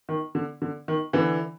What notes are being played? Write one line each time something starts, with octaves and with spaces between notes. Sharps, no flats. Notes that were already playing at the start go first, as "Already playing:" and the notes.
D#3
D3
D3
D#3
D3 E3